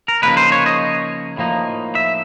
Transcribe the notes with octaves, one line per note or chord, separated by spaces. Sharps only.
A#4
C#3 F3 A#3 D#4 B4
C5
C#5
D#5
A2 F3 A#3 D#4
E5